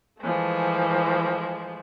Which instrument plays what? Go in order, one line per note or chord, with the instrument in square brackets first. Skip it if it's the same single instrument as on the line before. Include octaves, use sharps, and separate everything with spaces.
[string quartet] E3 F3 G#3 A3